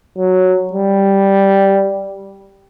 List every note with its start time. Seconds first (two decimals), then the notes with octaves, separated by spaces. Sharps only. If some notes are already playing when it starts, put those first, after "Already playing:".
0.17 F#3
0.73 G3